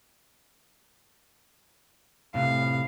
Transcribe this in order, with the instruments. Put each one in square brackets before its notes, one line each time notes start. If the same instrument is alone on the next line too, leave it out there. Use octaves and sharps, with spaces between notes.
[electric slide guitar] A2 C3 [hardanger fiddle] F5